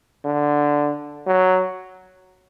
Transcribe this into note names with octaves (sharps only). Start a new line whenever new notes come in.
D3
F#3